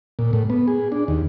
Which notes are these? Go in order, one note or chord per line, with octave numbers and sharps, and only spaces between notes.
A#2
A2
B3
G#4
D4
D#2